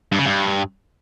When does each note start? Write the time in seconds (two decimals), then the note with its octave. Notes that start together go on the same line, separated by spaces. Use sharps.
0.12 G2
0.19 C#3
0.25 G2